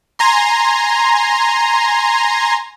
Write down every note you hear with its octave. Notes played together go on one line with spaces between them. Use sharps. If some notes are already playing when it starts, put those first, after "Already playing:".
G#5 A#5 C6